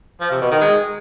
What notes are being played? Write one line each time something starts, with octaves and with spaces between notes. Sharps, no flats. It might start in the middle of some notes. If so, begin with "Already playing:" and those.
F3
C3
B2
D#3
G#3